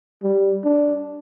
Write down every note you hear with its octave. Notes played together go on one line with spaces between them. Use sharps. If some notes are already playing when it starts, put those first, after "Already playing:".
G3
D4